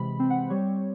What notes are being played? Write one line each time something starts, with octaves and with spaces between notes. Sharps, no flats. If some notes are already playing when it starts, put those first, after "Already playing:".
Already playing: C3 E3 G#3 B5
C4
F#5
G3 C#5